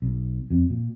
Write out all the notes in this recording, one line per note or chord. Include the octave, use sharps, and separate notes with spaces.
B1
F2
A#2